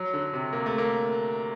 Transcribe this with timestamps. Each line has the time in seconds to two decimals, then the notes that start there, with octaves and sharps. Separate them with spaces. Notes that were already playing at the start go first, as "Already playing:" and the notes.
Already playing: F#3
0.14 D3
0.33 C3
0.53 A#3
0.66 A3
0.78 A#3